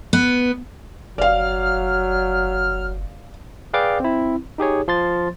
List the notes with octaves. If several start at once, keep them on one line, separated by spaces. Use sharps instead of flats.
B3
F#1 F#3 D5 F5 F6
G#4 B4 D5 F5 G5 D6
C4 E4
D#4 G4 G#4 C#5
F3 C6 A6